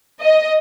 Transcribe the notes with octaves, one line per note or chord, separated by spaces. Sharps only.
D#5